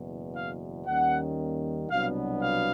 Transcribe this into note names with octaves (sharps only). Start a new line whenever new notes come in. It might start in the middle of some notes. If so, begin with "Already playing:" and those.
Already playing: F#1 E2 B2
F5
D#2 D#3 G3 A#3 C#4 F#5
C2 B2 F#3 B3 D4 F5
F5